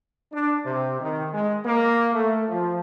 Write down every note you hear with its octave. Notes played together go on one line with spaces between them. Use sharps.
D4
C3
D#3
G#3
A#3
A3
F3